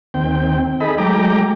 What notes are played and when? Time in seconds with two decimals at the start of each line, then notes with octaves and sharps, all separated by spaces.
0.14 D#2 C4 G5
0.80 D#4 G#4 A4 D#5 B5
0.98 F#3 G#3 A3 G5 A#5 D6